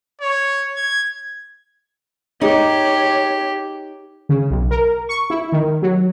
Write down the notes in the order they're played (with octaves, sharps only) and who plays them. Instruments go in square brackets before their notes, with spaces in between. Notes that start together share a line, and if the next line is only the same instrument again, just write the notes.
[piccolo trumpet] C#5
G#6
[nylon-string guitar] D#4 [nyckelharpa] G4 [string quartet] C#5
[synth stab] C#3
B1
A#4
C#6
E4
D#3
F#3